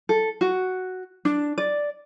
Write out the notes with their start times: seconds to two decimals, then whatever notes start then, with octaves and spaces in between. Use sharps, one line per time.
0.09 A4
0.41 F#4
1.25 D4
1.58 D5